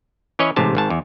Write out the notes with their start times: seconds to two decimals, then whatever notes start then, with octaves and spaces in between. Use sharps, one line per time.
0.39 E3 C#4 B4 C#5 D#5
0.56 A1 G#2 C3 A5
0.75 G#1 G#2 A5
0.90 E2